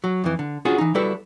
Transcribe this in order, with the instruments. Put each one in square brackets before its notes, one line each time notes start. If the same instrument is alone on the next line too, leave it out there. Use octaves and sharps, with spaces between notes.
[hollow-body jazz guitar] F#3
F2 E3
D3
C#4 D4 F4 F#4 G#4
E3 D#4
G3 E4 F#4 A4 B4 E5